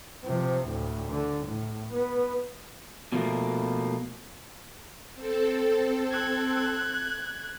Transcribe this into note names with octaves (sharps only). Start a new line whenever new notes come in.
C3 F3
D2 A2
D3
A2
B3
B2 F3 A3 A#3
C4 A4
F#6 G#6